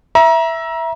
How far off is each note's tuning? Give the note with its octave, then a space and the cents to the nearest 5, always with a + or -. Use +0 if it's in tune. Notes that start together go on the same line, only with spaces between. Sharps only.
E5 +0 A#5 +30